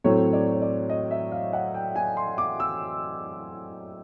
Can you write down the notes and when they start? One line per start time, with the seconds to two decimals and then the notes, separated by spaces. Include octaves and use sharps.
0.04 A2 F#3 A3 C4 C#5
0.33 D5
0.53 C#5
0.62 D5
0.89 D#5
1.11 E5
1.32 F5
1.53 F#5
1.74 G5
1.95 G#5
2.17 C6
2.38 D6
2.60 E6